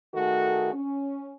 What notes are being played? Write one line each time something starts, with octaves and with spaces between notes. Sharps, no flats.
D#3 A3 F#4 G#4 A4
C#4